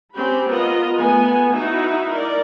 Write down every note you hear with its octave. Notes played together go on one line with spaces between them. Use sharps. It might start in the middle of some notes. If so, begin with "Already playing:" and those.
C4 C#4 G4 B5
B3 F4 A#4 D#5
A3 B3 G#5
D#4 E4 F#4 E5
A#4 D5